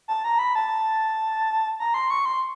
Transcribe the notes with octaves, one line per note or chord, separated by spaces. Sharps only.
A5
A#5
B5
A5
A#5
C6
C#6
C6